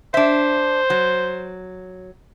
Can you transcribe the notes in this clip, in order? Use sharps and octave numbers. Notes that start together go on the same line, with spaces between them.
D4 C5 E5
F#3